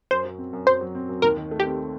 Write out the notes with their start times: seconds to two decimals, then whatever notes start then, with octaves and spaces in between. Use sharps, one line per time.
0.11 F#2 C5
0.25 F#3
0.38 C4
0.53 F#2
0.67 F#2 C5
0.81 F#3
0.95 C4
1.09 F#2
1.22 D#2 A#4
1.37 D#3
1.51 A3
1.60 G4
1.65 C4